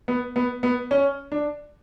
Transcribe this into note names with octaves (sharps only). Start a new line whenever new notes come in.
B3
B3
B3
C#4
D4